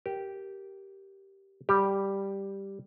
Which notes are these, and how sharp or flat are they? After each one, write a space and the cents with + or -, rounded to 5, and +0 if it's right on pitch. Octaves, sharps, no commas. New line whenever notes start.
G4 -10 A#4 +0
G3 +0 G4 +0